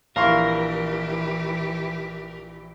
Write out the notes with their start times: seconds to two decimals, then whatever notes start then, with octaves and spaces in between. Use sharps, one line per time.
0.16 A#1 E3 E4 G4 A#4 F5 C6 C#6